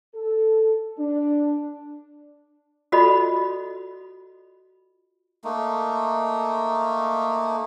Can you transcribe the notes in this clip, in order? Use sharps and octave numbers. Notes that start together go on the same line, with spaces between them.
A4
D4
F4 F#4 A4 D5 D#5 B5
A3 A#3 D#4